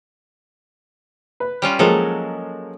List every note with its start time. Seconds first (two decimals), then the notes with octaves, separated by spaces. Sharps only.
1.40 B4
1.62 G3 C#4 F4
1.79 F3 F#3 G#3 A#3 A4